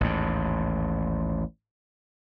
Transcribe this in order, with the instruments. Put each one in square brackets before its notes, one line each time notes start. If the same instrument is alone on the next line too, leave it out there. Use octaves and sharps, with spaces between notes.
[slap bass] A1 D#2 G#2